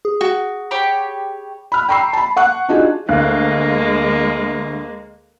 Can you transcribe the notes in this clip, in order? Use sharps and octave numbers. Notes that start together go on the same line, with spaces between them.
G#4
F#4
G4 C#5 B5
B5 F6
G5 A#5 B5 C#6 E6 C7
A5 B5
F#5 C#6 F#6
D4 D#4 F4 F#4 G#4
D2 G#3 A#3 F5 F#6